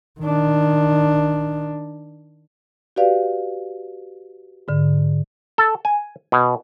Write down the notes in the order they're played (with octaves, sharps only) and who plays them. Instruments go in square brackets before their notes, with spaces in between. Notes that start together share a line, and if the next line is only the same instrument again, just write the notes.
[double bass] D#3 D4
[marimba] F#4 G4 B4 D5 F5
G#2 D3
[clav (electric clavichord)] A4
G#5
B2